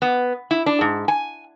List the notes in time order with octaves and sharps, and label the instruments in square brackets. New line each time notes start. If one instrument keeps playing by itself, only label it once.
[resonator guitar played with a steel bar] B3
E4
D4
G#2
G#5